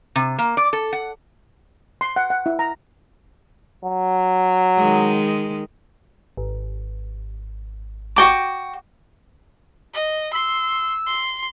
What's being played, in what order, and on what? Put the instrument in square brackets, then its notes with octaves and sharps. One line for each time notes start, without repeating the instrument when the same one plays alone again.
[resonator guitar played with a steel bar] C3
A#3
D5
A4
F#5
[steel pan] C6
F#5
F#5
E4
A#5
[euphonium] F#3
[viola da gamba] D#3 G#3
[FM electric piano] G#1
[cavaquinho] F#4 G5 D6
[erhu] D#5
[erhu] C6 [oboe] E6
[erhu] C6